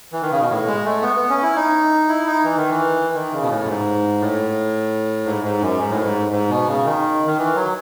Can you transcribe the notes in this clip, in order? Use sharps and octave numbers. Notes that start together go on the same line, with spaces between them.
E3
D#3
C#3
B2
A2
G#3
A3
B3
B3
C#4
E4
D#4
E4
D#4
E3
D#3
E3
D#3
C#3
B2
A2
F#2
G#2
A2
G#2
G#2
F#2
G#2
A2
G#2
G#2
B2
C#3
D#3
D#3
E3
F#3